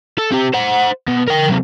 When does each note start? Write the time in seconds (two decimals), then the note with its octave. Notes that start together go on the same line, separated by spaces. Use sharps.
0.18 A4
0.32 C4 G4
0.53 C5 F#5
1.08 B2
1.28 A#4 G5
1.48 C3 F#3